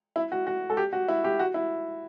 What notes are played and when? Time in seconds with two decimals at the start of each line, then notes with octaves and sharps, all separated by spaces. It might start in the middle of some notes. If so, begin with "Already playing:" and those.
0.16 E4
0.32 F#4
0.47 F#4
0.70 A4
0.77 G4
0.93 F#4
1.08 E4
1.24 G4
1.39 F#4
1.54 E4